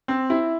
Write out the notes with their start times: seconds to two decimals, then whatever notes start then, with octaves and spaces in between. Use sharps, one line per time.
0.08 C4
0.30 E4